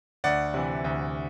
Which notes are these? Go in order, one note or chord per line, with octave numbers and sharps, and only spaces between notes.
D2 D5 F#5
C3 E3
D2